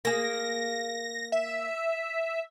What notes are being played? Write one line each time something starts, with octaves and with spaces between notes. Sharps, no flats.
A#3 G#4 A#6
E5